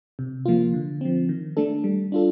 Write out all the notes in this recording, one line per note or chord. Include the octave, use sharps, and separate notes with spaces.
C3
F3 A#3 F4
D3
F3 C4
D#3
A3 D4 A4
G3
D4 F4 A4